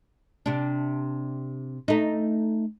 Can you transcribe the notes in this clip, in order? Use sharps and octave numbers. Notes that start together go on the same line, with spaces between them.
C3 D4
A3 D#4